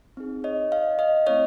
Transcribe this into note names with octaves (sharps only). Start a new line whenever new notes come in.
C4 D#4 G#4
C#5 D#5
D#5 F5
D#5 F5
A3 C4 E4 C#5 D#5